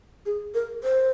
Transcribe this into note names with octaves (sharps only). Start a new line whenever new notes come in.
G#4
A#4
C5